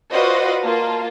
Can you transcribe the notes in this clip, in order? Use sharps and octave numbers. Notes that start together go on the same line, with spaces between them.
F4 F#4 B4 C5 D5 D#5
A#3 F4 A5